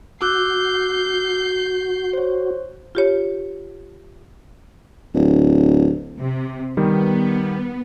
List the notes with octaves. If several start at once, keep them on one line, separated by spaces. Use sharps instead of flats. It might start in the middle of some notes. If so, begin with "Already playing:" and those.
F#4 D6 E6 F#6 G6 C7
C5 C#5
F4 G4 C#5
D1
C3
D#3 G3 B3